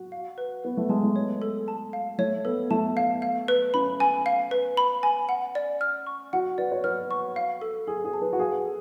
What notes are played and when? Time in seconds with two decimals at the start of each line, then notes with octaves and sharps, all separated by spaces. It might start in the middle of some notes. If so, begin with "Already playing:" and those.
Already playing: F#4
0.12 F5
0.38 B4
0.64 B3 B4
0.77 A3
0.89 G#3 A5
1.03 A3
1.16 C#5
1.42 A4
1.68 A5
1.93 F5
2.18 A3 C#5
2.45 B3 A4
2.71 A3 A5
2.97 F5
3.22 F5
3.48 B4
3.74 C#4 B5
4.00 G#5
4.26 F5
4.51 B4
4.77 B5
5.03 G#5
5.29 F#5
5.55 D5
5.81 F6
6.07 C#6
6.33 F#4 F#5
6.58 B4 D5
6.72 C#5
6.84 B4 F6
7.11 C#6
7.36 F5
7.61 A4
7.87 G#4 A4
8.04 G#4
8.13 A5
8.22 B4
8.33 F#4
8.39 G#4 F5
8.65 A4